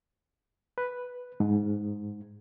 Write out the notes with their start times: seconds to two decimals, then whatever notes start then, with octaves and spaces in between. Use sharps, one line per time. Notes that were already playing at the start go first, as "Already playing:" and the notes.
0.78 B4
1.40 G#2